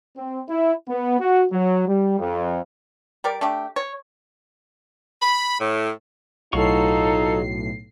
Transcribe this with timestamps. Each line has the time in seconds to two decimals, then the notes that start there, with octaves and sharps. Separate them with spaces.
0.17 C4
0.49 E4
0.89 B3
1.20 F#4
1.52 F#3
1.88 G3
2.19 F2
3.24 G3 A#4 D5
3.41 A3 D4 G4
3.76 C#5
5.21 B5
5.59 A2
6.53 B1 A2 F#3 D#4 F4 A4 C#6 C7